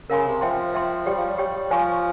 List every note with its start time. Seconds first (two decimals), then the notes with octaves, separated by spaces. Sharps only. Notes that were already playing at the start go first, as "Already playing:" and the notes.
0.09 C#3 A#4 F5 G#5 C6
0.26 C3
0.41 F3 C5 E5 G5 C6
0.74 C5 E5 G5 C6
1.06 G3 G4 C#5 G5
1.17 F3
1.29 G3
1.38 G4 C#5 G5
1.71 F3 C5 F5 G#5 C#6